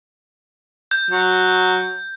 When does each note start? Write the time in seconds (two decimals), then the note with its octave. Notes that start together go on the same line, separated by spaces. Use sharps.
0.91 G6
1.11 F#3